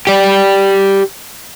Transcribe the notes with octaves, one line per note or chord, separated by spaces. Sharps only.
G4 D5